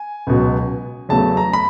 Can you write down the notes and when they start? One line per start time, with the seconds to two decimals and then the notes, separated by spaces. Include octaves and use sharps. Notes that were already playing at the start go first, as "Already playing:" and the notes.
Already playing: G#5
0.27 C#2 B2 F#3
1.09 E2 C#3 F#3 A3 A5
1.37 A#5
1.53 B5